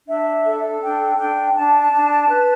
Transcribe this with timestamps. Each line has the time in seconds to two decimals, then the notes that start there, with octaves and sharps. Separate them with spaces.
0.07 D4 E5
0.45 A4
0.81 D4 G5
1.18 D4 G5
1.55 D4 A5
1.92 D4
2.29 B4